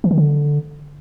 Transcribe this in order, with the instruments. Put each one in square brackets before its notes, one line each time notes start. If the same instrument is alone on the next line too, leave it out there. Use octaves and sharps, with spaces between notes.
[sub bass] E3
D#3
D3